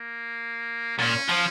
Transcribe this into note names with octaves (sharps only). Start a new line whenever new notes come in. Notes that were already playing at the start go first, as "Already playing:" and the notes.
Already playing: A#3
A#2 C#4
F3